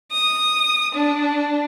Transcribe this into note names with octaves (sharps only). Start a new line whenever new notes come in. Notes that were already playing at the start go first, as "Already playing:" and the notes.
D#6
D4